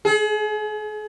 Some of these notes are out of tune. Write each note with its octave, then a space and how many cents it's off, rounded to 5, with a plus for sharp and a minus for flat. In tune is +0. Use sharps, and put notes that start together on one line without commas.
G#4 +40